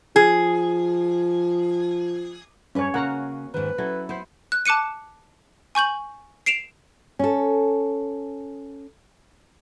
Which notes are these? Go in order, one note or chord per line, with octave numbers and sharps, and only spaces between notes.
F3 G#4
G2 C#4 B4 C#5
C#3 A#3 F#4 A#4 C#5 F#5
G#2 D#3 B4
F#3 C#4 E4 A4
B3 E4 C5
F#6
A5 D6 F#6 C#7 D#7
G#5 C#6 G6 F#7
C7 D7 E7 F7
C#4 A4